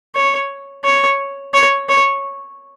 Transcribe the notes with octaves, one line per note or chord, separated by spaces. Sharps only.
C#5
C#5
C#5
C#5